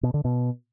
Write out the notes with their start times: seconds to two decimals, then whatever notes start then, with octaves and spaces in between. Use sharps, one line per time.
0.03 B2
0.14 D3
0.25 B2